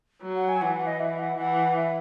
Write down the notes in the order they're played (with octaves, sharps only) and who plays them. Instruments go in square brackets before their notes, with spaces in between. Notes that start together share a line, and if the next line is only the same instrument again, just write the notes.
[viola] F#3
[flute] F#5
G#5
[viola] E3 [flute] F#5
[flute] F#5
D#5
E5
F#5
[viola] E3 [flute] F#5
[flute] E5